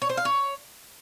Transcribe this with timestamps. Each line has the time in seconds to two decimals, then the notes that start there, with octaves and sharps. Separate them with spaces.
0.02 C#5
0.09 C5
0.17 F5
0.25 C#5